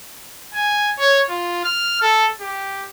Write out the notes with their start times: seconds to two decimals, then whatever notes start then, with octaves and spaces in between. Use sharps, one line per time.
0.54 G#5
0.99 C#5
1.30 F4
1.65 F6
2.02 A4
2.41 G4